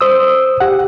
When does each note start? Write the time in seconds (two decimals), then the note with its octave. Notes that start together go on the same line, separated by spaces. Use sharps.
0.01 C5 D#6 E6
0.60 G4 F#5